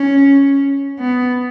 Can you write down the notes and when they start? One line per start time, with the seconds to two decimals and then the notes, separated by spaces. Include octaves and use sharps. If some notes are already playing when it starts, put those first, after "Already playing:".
Already playing: C#4
0.99 B3